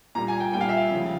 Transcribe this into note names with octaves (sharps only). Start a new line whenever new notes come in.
A#2 G3 A#5
G#5
G5
A#2 G3 G5
F5
E5
F5
C#3 F3 G#3